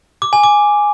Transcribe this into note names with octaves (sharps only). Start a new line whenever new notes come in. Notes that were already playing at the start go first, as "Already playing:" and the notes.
D6
G#5
D6